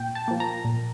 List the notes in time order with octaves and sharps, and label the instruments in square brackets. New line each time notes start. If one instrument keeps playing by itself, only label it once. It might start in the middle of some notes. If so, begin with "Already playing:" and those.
Already playing: [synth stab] A#2 G5
A5
F3 A#3
A#5
A#2